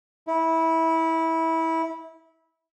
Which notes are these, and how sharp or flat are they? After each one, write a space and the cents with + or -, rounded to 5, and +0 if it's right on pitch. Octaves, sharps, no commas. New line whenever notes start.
E4 -20